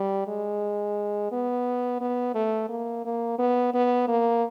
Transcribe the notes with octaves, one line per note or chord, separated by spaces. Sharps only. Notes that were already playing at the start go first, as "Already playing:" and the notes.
Already playing: G3
G#3
B3
B3
A3
A#3
A#3
B3
B3
A#3